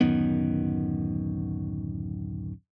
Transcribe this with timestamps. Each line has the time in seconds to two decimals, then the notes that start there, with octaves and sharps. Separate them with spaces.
0.01 D1 F#2 D#3 B3